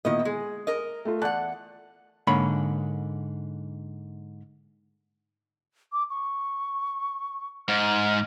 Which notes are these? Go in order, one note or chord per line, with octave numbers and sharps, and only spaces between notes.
A#2 D#3 B3 E4 D#5
G#3 G#4
A#4 D#5
A3 F4
E2 D5 F#5 A5 F#6
G#2 D3 A#3 C#5 B5
D6
C#6
G#2 F6